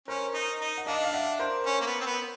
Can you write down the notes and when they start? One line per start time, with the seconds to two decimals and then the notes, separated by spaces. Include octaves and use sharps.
0.08 C#4 A#4 C5
0.34 D#4
0.61 D#4
0.78 F#5
0.86 D4 D#5 F5
1.04 F5
1.13 E5 F#5
1.39 A#4 C5
1.66 C#4
1.81 A#3
1.87 B3
2.01 C4
2.06 B3